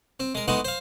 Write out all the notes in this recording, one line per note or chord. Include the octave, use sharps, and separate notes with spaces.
C4
G#3 A#4
G#3 A3 B3 D#4 F#4
C5 F5